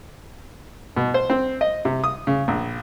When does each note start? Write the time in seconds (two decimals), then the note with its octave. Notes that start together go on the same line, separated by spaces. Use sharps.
0.97 B2
1.14 C5
1.30 C4
1.61 D#5
1.85 C3
2.04 D#6
2.27 C#3
2.48 A#1